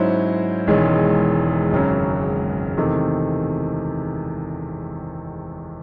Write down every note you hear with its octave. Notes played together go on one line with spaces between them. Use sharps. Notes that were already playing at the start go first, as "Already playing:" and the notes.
Already playing: G#2 F#3 C#4 E4 C5
E1 E2 D#3 G#3 C#4
G#1 F#2 C#3 F#3
E2 C3 D#3 A3